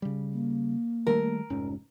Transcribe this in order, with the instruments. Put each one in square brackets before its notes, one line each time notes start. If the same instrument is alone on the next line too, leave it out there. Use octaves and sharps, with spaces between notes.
[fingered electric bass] C#3 G3
[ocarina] A#3
[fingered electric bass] D#3 G3 A3 [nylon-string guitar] A#4
[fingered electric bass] F1 G#2 C#4